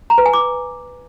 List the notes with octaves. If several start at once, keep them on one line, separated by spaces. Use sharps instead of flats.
A#5
B4
G#5
D6